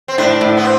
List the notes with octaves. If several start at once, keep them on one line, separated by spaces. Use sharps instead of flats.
C4
A2 D4
A2
B3
C4